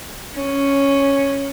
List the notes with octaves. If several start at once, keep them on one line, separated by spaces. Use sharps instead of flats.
C#4